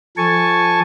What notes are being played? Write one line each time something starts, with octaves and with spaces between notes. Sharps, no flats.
F3 A4 G#5 A5 C#6